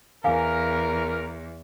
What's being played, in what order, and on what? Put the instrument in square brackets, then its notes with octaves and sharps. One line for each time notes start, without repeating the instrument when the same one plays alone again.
[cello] E2 [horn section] A#4 [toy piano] F5 G#5 D6